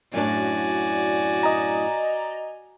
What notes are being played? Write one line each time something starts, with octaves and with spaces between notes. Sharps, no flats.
F#2 A2 D4 F#4 D5 G#5
D#5 A#5